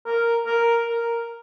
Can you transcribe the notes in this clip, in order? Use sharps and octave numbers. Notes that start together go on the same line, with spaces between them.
A#4
A#4
A#4